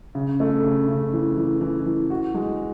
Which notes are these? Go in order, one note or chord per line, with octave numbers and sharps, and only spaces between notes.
C#3
A3
C#3
C#3
E3
E3
E3
E3
F#4
G#3